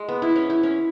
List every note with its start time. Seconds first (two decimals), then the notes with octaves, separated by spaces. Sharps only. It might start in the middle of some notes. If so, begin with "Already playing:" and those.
Already playing: G#3
0.09 B3
0.22 E4
0.36 C#4
0.50 E4
0.63 C#4